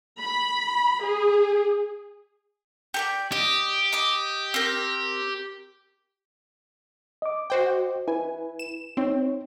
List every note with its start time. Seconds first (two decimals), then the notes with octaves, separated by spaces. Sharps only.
0.21 B5
1.03 G#4
2.94 G4 A4 D5
3.32 G4 D#5
3.93 D#5 D6
4.54 C4 A#4
7.22 D#5 D6
7.50 F#4 C5 G5
8.08 E4 B4 G#5
8.59 E7
8.97 C4 D#4 C#5